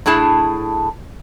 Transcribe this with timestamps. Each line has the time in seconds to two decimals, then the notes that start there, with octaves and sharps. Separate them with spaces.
0.06 A2 D4 E4 G#4 A5